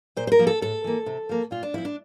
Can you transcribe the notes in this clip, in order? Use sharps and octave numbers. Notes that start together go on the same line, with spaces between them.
A#2 C5
C5
A#4
F3 A#3
A4
A2 A4
E3 A#3
C3
F3 A#3
A#2 F4
D4
F3 C4 E4
D4